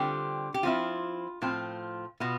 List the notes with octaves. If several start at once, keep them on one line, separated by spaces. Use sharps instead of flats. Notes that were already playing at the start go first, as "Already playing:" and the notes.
Already playing: D3 G3 C4 F4 G4
G4
F3 C4 E4 F4
A2 F3 C4 F4
B2 B3 F4